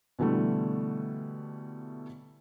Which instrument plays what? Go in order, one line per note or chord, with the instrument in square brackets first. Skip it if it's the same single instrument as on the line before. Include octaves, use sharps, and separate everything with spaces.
[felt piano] B2 D3 E3 G3 A3